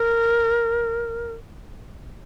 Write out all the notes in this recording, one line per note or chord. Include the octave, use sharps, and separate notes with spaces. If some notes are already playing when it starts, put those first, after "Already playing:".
Already playing: A#4